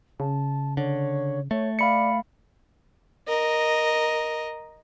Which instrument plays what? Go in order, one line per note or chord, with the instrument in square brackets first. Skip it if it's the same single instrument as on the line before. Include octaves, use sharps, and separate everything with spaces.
[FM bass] C#3 [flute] A5
[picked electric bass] D3 [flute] C#5
[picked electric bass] A3 [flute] C#5
[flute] D5 [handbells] F5 B5 C#7
[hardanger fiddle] A#4 D#5